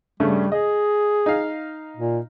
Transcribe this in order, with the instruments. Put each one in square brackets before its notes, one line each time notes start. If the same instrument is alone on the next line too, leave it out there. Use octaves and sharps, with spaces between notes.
[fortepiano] G2 C#3 A3 [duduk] G3
[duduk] G#4 [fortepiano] D#5
[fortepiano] D#4 F5
[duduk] A#2